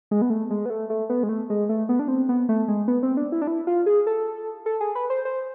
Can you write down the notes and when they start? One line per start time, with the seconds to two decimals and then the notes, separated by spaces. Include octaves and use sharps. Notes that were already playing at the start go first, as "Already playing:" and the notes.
0.11 G#3
0.22 B3
0.30 A3
0.50 G#3
0.66 B3
0.70 A3
0.90 A3
1.10 B3
1.23 G#3
1.29 A3
1.50 G#3
1.69 A3
1.89 B3
1.99 D4
2.08 C4
2.29 B3
2.49 A3
2.68 G#3
2.88 B3
3.03 C4
3.17 D4
3.32 E4
3.42 D4
3.47 E4
3.67 F4
3.86 G#4
4.07 A4
4.66 A4
4.81 G#4
4.95 B4
5.10 C5
5.25 C5